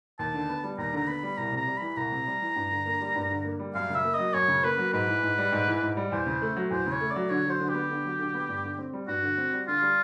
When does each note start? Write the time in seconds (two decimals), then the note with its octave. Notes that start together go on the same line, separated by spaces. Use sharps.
0.19 D#2 A5
0.34 D3
0.49 B3
0.64 G3
0.78 D#2 A#5
0.93 D3 A#5
1.08 B3 B5
1.23 G3
1.37 C2 A#5
1.52 C3
1.57 A#5
1.67 G3
1.77 E3 B5
1.97 C2 A#5
2.12 C3
2.27 G3
2.42 E3
2.56 G2
2.71 D3
2.86 A#3
3.01 G3
3.16 G2
3.30 D3
3.45 A#3
3.59 G3
3.75 F#2 F5
3.90 C#3 E5
4.04 A#3
4.15 F#3 D#5
4.34 F#2 C#5
4.48 C#3
4.64 A#3 B4
4.78 F#3
4.93 G#2 B4
5.08 E3
5.23 G#2
5.38 G3
5.52 G#2
5.68 E3
5.82 G#2
5.97 G3
6.12 E2 C5
6.27 C#3
6.42 A3
6.56 F#3
6.71 E2 C5
6.86 C#3 C#5
7.01 A3
7.11 D5
7.16 F#3
7.30 D3 C#5
7.45 F#3
7.50 C5
7.60 D3
7.69 G4
7.75 B3
7.90 D3
8.05 F#3
8.19 D3
8.34 B3
8.49 G2
8.64 D3
8.78 C4
8.93 G3
9.08 G2 F#4
9.23 D3
9.38 C4
9.53 G3
9.67 D3 F4
9.82 G3